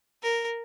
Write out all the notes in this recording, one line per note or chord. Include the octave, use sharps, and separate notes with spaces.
A#4